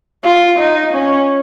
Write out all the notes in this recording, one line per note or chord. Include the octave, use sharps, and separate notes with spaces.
F4
D#4
C#4